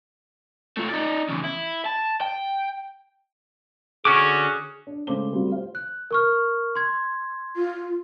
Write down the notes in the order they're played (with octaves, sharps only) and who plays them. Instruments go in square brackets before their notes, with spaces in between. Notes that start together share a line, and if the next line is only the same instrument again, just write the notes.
[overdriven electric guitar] A3 F4
D#4 D5
E2 C#3
E4
A5
G5
[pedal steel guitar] D3 F#4 D6 [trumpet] C#4 [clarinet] G#4
[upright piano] D4
C#3 G#3 A3 C5 D6 G7
G3 A3 C4 F4 F#4
C5 F5
[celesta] F#6
A#4 C#6 F6
C6 G#6
[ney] F4